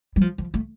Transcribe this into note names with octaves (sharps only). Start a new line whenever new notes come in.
G3
F3
F3
A3